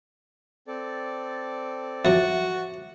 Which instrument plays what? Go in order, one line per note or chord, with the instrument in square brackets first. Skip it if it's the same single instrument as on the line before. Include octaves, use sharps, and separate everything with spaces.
[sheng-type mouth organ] C4 A4 D5
[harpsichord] F2 F#3 [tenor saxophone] F#4 [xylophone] E5